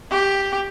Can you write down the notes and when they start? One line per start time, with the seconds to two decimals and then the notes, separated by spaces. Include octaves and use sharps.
0.11 G4